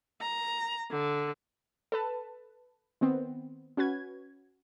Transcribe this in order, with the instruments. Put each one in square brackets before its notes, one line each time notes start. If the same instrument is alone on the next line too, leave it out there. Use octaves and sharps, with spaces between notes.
[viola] A#5
D3
[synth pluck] A4 B4 A5
D#3 B3 C4
C#4 F#4 B4 G#6